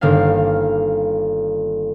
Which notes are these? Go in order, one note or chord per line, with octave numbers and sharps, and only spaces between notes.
G1 D#3 A#3 B3 F5